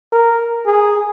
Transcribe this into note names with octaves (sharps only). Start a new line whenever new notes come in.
A#4
G#4